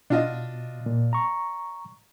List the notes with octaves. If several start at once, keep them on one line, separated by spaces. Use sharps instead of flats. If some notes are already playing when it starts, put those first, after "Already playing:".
B2 D4 F4 D#5
A#2
A#5 C#6